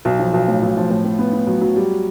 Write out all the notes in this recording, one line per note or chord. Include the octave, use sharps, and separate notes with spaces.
B1
F3
B1
A2
B1
F3
A2
A2
B3
B3
F#3
F#3
G3